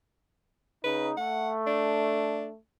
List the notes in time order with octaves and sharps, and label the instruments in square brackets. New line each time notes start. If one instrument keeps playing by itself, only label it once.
[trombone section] C#3 D#4 [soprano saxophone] B4
[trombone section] A3 [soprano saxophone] F#5
[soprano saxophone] D4